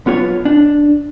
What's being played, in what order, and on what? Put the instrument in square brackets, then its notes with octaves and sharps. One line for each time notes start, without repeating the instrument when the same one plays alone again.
[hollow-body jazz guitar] B1 B3 F4 C#5
D4